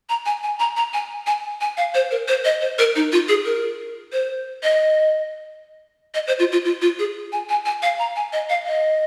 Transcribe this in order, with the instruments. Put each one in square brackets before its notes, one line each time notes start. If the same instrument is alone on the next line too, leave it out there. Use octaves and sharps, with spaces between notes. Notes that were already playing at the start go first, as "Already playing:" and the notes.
[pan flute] A#5
G#5
G#5
A#5
A#5
G#5
G#5
G#5
F5
C5
A#4
C5
D#5
C5
A#4
D#4
F4
G#4
A#4
C5
D#5
D#5
C5
F4
F4
F4
F4
G#4
G#5
G#5
G#5
F5
A#5
G#5
D#5
F5
D#5